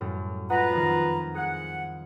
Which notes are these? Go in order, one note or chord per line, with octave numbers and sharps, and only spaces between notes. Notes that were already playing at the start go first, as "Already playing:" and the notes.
F#2 A2 G3
F4 B4 D#5 F#5 A#5 B5
F2 D#3
G#4 F#5